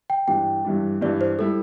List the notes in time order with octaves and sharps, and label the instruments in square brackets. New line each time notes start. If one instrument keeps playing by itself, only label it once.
[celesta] G5
[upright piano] G2 E3 G3 D4 [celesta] G5
[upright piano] G2 E3 G3 D4
[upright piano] G2 E3 G3 D4 [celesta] D5
[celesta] C5
[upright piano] G3 E4 [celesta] A4